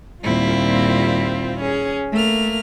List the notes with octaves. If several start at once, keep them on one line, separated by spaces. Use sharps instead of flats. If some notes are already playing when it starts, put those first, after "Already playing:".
D#2 A#2 G3 C4 E4 F4
C#4 G#4
A3 A#3 F6